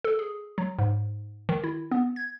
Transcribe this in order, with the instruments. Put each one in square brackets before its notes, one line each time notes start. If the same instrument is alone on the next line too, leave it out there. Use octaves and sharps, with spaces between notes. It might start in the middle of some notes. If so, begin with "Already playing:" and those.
[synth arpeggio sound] A4
G#4
F#3
G#2
D#3
E4
B3
G#6